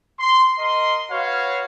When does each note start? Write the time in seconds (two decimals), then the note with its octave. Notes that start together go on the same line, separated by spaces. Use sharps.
0.20 C6
0.58 A#4 D#5 C6
1.11 F#4 B4 C#5 F5